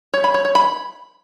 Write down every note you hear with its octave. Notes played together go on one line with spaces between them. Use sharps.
C#5
B5
C#5
C#5
B5